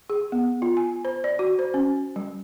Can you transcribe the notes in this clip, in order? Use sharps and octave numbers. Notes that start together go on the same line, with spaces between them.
G#4
B3
F4
G#5
C5
D5
F#4
C5
C#4
G3